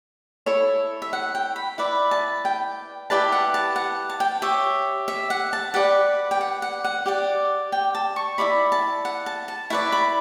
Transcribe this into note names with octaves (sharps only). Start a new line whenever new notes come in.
E4 A4 C#5
E5
F#5
G5
B5
E4 B4 D5 B5
A5
G5
E4 G4 B4 D5 A5
F#5
A5
F#5
A5
G5
G4 C#5 E5
E5
F#5
A5
G4 B4 D5 F#5
G5
F#5
F#5
F#5
G4 D5 F#5
G5
A5
C#6
E4 A4 D5 B5
A5
F#5
A5
A5
E4 B4 D5 C#6
B5